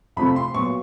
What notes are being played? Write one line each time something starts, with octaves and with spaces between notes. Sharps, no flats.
F2 C3 F3 A3 C4 B5
C6
A#2 F#3 B3 C#6